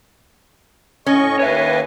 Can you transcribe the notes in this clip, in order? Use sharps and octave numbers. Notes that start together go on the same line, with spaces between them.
A2 C#4 D#5 C#6
D#2 B4 C#5 E5 G#5